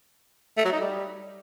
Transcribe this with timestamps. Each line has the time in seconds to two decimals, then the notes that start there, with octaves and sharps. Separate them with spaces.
0.57 A3
0.65 F#3
0.73 D#4
0.81 G3